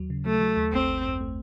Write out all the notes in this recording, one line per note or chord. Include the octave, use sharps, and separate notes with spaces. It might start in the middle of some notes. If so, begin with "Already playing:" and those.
Already playing: D#2 F#3
C#3
F#3 A3
F#3
D#2
G#1 C4
G#1
F#2
A3